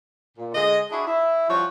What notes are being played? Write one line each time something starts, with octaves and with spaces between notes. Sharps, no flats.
A#2
D3 G#3 G#4 D#5
D4 E4 F#4 G#4
E4
F3 G3 C#4 F#4 C#5